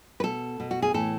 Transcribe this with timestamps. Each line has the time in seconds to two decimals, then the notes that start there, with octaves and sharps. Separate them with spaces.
0.20 B4
0.23 B2 A4
0.60 B2
0.71 F#4
0.82 G#4
0.94 A2 E3 A4